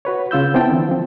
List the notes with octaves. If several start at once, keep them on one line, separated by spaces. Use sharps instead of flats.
F#4 B4 C#5
C#3 F4 E6 G6
B3 C4 E4 G5 A5
D3 E3
F3 C4